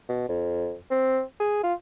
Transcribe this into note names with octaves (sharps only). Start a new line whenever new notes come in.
B2
F2
C4
G#4
F4